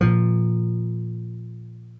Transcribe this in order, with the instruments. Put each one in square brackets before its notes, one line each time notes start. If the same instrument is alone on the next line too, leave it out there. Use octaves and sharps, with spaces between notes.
[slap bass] A#2 F3